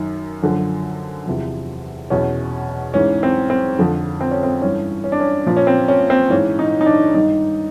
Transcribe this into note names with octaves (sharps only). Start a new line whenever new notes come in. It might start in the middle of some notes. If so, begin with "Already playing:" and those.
Already playing: F#2 D#3
F#2 D3 F3
E2 C3 F3
E2 B2 C#4
G#2 E3 C#4
C4
C4
F2 D3 F3
C4
C#4
C4
G2 E3 C#4
C#4
D4
C#4
A#2 F3
C#4
C4
C#4
C4
G#2 E3 C#4
D#4
D#4
D4
G2 D#3 D#4